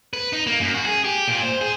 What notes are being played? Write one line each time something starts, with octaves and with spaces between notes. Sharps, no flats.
B4
D#4
A#3
F#2
F#4
G#4
G4
A#2
C5
G#4